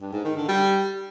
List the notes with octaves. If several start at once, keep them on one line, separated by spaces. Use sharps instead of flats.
G2
G#2
D#3
D3
G3